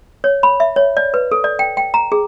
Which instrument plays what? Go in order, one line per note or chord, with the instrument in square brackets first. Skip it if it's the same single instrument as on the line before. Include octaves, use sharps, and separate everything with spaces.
[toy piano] C#5
B5
E5
C#5
D5
B4
A4
D5
G5
G5
A#5
G#4